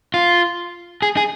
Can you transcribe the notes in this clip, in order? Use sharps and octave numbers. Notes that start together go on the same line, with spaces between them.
F4
G#4
G#4